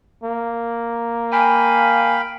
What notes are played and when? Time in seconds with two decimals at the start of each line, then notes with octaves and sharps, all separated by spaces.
0.24 A#3
1.32 F5 G5 G#5 B5